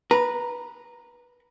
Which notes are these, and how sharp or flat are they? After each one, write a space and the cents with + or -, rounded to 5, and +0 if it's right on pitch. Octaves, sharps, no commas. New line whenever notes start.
B4 -15 A#5 +0